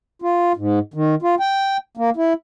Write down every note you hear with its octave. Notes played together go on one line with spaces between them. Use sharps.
F4
G#2
D#3
F4
G5
A#3
E4